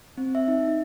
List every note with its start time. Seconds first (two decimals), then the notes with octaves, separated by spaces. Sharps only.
0.18 C4
0.35 E5
0.48 D#4
0.68 D#4